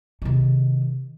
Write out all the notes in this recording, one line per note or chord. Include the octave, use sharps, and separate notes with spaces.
C3 D#3